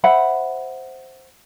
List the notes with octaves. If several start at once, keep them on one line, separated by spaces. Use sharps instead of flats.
C5 E5 F#5 B5